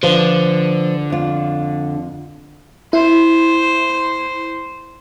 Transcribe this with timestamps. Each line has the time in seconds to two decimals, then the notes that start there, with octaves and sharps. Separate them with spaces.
0.03 D3 F3 B4 C5
1.10 F2 F4
2.93 E4 C5